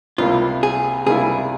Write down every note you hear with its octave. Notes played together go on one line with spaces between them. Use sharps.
C#2 C3 G3 A#3 E4 F4
G#4
C#2 C3 G3 A#3 E4 G#4